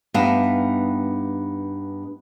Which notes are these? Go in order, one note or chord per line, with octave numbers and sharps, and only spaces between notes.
G2 B3 D#4 E5 F5